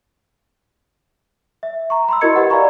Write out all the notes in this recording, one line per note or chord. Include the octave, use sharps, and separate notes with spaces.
E5
A#5 C#6
B5 C6 E6
E4 F#4 A#4 D#5 G#6 C#7
G4 B4 D#5 F#5
D5 F5 G#5 A#5 B5 C#6